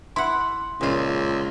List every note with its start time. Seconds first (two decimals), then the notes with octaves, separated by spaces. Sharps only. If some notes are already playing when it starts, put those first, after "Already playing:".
0.16 E4 F#5 C6
0.81 C#2 A#2 F4